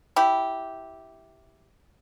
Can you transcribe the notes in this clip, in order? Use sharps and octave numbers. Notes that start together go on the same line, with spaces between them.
E4 G4